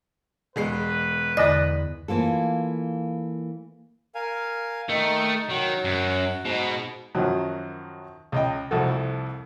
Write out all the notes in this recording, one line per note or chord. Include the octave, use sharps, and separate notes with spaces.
E1 G#3 B4 C7
E2 D3 D5 D#5 F#6
E3 A#3 F4 A4
A#4 F5 G#5
D#3 A3 D#4
D#3 F#3 F#4
F#2
G#2 B2
F#2 D#3 F3 F#3
C#2 D#5 G5
C2 F2 F#4 A4